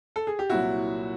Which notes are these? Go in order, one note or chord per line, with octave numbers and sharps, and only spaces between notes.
A4
G#4
G4
C2 A#2 F#3 E4 F#4